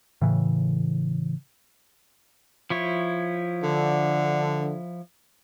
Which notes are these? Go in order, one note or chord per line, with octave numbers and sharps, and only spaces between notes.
A2 C#3 E3
F3 E4 C#5
D3